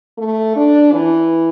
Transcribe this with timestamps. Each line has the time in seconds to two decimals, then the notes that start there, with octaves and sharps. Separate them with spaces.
0.18 A3
0.56 D4
0.93 E3